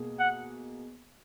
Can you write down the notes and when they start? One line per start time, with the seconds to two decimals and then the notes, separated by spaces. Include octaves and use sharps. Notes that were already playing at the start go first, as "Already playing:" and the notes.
Already playing: B2 A#3 G#4
0.19 F#5